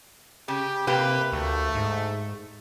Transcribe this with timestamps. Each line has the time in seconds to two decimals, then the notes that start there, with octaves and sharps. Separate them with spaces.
0.48 C#3 G4
0.87 C3 A#3 G4 B4
1.32 D2 A3
1.75 G#2